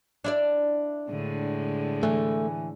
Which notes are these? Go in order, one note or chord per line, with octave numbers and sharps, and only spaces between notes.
D4 E4 D5
A2 D3 G#3
E3 A3